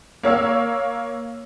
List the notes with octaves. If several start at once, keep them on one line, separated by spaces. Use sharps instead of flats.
A#3 C#5 F5 E6